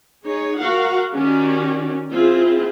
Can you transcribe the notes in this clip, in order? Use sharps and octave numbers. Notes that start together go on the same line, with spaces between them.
D#4 G#4 C#5
F#4 A#4 F5 F#5
D#3 C#4 F#4 G4 D5
C4 E4 F4 G#4